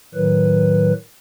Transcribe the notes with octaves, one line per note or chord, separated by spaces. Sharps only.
A2 D#3 F#3 B4